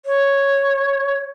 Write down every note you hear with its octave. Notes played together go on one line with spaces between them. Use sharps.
C#5